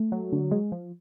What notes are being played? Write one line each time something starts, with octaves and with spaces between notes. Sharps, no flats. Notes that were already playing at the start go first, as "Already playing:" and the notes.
Already playing: A3
F#3
D3
G#3
F3